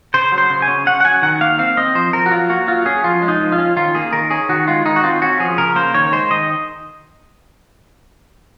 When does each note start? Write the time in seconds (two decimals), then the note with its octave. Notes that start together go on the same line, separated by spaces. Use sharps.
0.14 C#3 C5
0.32 F#3
0.38 C5
0.50 C#3
0.62 G#5
0.68 C#4
0.86 C#4 F#5
1.00 F#5
1.04 F#3 G#5
1.22 D#3 F#5
1.41 A#3 F5
1.59 C4 F5
1.77 C4 D#5
1.95 F3 C5
2.13 F3 A#4
2.26 F#4
2.31 F#3 F4
2.50 A#3 F#4
2.68 F#3 F4
2.86 C#4 G#4
3.04 F3 F4
3.22 G#3
3.28 D#4
3.40 F3
3.52 F4
3.58 C#4
3.77 D#3 F4
3.95 A#3 G#4
4.13 D#3 A#4
4.30 C#4 G#4
4.49 D#3 F#4
4.67 G#3 F4
4.85 D#3 D#4
4.96 F#4
5.03 C4 F4
5.22 C#4 F#4
5.40 F3 G#4
5.58 C#3 A#4
5.76 A#3 C5
5.94 D#3 C#5
6.12 G#3 C5
6.31 D#3 D#5